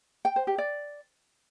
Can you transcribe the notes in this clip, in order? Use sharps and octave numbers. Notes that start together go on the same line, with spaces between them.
G5
C5
G4
D5